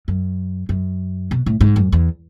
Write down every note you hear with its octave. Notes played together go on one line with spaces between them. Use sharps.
F#2
F#2
B2
A2
G#2
F#2
E2